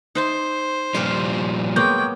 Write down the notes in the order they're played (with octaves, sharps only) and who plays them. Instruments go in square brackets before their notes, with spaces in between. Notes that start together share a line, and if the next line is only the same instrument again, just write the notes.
[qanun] D#4 E5 A5 [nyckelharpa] C5
[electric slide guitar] A#2 F3 G3 [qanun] F4 G4 B4
[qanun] F#3 A#3 B3 [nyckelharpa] G#3 G5 [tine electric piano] C#6 D6 G6